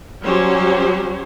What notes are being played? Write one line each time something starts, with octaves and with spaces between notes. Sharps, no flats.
F#3 G3 C#4 G4 C5 C#5